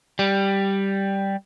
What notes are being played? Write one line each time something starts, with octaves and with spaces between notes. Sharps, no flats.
G3